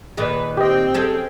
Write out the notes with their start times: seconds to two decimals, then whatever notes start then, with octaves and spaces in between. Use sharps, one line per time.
0.17 A#2 D#3 G#4 B4
0.57 C4 G4 D#5 G5
0.94 C#4 G#4 A4